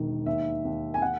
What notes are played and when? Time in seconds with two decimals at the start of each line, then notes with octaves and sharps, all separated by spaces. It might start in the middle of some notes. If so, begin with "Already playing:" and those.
Already playing: E1 D#3
0.26 D#2 E5
0.65 D#2
0.94 G#5
1.02 F#5